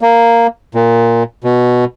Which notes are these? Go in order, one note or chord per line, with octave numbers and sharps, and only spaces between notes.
A#3
A#2
B2